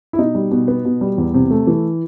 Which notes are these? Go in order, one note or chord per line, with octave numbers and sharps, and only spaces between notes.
E4
B2 D#4
G3
B2
B3
B2
G3
E2
C3
A3
E3